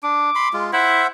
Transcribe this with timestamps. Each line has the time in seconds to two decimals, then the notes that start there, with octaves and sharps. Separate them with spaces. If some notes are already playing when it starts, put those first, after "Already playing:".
0.03 D4 D6
0.35 B5 C6
0.54 G#3 F4
0.73 E4 C5 E5 F#5